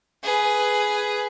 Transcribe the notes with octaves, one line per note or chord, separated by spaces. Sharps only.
G#4 B4